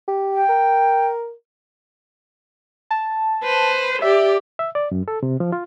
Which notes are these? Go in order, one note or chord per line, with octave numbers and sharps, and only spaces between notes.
G4
G5
A#4
A5
B4 C5
G4 D5 E5
E5
D5
F#2
A4
C3
F3
F4